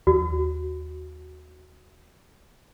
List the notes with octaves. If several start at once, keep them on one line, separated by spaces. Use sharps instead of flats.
D#2 F#4